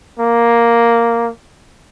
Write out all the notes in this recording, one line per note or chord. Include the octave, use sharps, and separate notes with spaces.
A#3